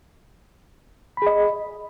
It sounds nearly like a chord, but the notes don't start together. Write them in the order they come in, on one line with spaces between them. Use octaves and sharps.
B5 G#4 D#5